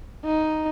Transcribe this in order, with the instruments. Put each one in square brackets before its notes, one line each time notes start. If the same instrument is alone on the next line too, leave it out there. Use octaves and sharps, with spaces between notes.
[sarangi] D#4